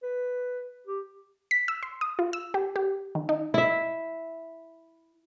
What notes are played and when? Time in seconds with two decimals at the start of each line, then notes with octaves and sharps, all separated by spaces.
0.03 B4
0.87 G4
1.51 B6
1.68 E6
1.83 C6
2.01 D#6
2.19 F4
2.33 E6
2.54 G4
2.76 G4
3.15 D#3
3.29 D#4
3.54 E4 E5